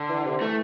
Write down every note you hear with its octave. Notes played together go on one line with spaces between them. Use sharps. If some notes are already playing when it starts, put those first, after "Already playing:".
Already playing: D3
E3
C3
E3 A3